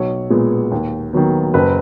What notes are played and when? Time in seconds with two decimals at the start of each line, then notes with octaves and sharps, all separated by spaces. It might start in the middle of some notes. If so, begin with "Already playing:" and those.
Already playing: B1 C#5
0.30 A#2 G#3 B3
0.72 D#2
1.13 D#3 F#3 B3
1.54 F#1 B4